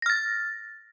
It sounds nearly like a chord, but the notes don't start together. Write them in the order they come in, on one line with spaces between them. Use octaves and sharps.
A#6 F6 A6